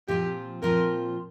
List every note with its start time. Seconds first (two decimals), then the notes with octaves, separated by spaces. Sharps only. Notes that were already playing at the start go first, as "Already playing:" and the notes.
0.08 A#2 F3 C4 F4 G4
0.62 A#2 F3 C4 F4 A#4